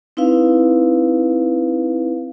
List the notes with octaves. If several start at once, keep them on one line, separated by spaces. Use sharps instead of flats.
C4 D#4 E4 B4 F5